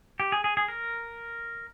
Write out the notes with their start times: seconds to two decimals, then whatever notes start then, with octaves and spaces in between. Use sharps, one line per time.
0.20 G4
0.32 G#4
0.44 G#4
0.57 G#4
0.68 A#4